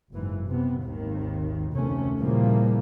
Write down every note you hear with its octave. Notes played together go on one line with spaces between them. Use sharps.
F#1 G#2 E3
C3 B3
G#1 D#2 D#3
F1 D2 C3 D#3 A3 C#4
A#2 C#3 E3 F3 G3 A#3